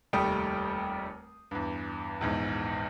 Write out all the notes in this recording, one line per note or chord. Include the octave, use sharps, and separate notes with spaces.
F1 D#2 G3 A3 G5 D#6
E2 G2
A#1 E2 G#2